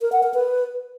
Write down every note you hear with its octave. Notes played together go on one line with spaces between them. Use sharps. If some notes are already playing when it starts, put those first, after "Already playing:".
A#4
F#5
A#4
B4